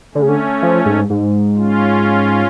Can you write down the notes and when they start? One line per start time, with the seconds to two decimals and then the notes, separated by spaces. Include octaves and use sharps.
0.14 D3 A3 C#4
0.22 C#3
0.29 D3
0.62 F3
0.86 G#2
1.10 G#2
1.56 C#4 F4